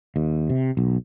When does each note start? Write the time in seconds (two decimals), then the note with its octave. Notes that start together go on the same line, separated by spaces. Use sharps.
0.16 D#2
0.50 C3
0.77 B1